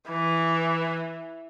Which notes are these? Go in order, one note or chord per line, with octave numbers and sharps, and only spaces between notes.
E3